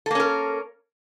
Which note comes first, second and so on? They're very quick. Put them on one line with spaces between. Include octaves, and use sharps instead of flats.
A4 A#3 C#4 A#4